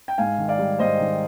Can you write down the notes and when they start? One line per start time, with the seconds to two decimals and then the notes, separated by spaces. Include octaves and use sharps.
0.08 G5
0.18 G#2 F5 G#5
0.38 D#3
0.48 D5 F5
0.58 G3
0.79 G#2 C5 D#5
1.00 D#3